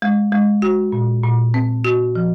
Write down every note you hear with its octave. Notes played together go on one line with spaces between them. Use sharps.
G#3
G#3
F#4
A#2
A#2
C4
F#4
F3